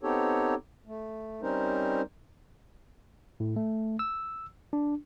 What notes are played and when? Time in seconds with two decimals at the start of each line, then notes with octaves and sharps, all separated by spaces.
0.03 B3 C4 D#4 G4 A4 C#5
0.87 A3
1.42 G3 C4 C#4 D#4 A#4 C5
3.40 A2
3.56 A3
3.99 E6
4.73 D4